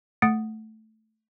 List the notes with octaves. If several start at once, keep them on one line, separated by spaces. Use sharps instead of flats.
A3 F#5 D#6 A6 C#7 D7